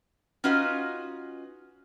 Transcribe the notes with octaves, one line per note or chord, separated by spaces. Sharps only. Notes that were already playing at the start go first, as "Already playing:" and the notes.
C#4 D#4 F4 F#4 B4 D#5